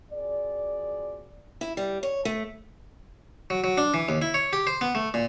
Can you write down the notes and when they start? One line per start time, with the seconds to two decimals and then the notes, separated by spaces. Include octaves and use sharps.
0.12 C4 F4 F#4 G#4 D5
1.61 E4
1.77 G3
2.03 C#5
2.25 A3
3.50 F#3
3.64 F#3
3.78 D4
3.94 E3
4.09 D#2
4.22 E4
4.34 C#5
4.53 G4
4.67 C5
4.81 B3
4.95 A3
5.14 A#2